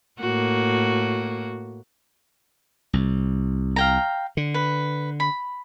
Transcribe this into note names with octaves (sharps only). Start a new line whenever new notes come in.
A2 A#3 F#4
C2
F5 G5 A#5
D3
B4
B5